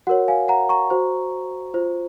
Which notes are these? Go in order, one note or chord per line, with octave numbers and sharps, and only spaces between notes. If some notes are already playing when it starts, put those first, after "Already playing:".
F#4 A#4 C#5 F#5
F5 G#5
F#5 A#5
A#5 C#6
F#4 C5
F4 C5